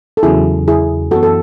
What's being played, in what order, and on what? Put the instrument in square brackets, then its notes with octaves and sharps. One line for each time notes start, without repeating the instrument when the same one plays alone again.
[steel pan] A4
[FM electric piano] E2 C#3 F#3 [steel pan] E4 G#4
[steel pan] E4 G#4
[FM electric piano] F#2 [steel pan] F#4 A4
[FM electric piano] E3 B3
[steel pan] A4